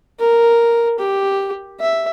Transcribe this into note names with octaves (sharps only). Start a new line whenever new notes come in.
A#4
G4
E5